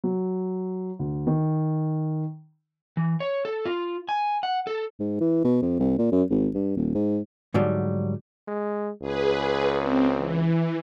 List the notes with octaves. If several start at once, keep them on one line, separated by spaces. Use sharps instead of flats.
F#3
D2
D#3
E3
C#5
A4
F4
G#5
F#5
A4
G#2
E3
B2
F2
C2
A#2
F#2
G#1
G2
D#1
G#2
G#2 D3 F#3 G3
G#3
C#2 G#4 B4
C4
E3